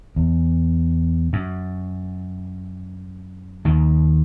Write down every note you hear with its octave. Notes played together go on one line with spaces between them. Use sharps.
E2
F#2
D#2 D#3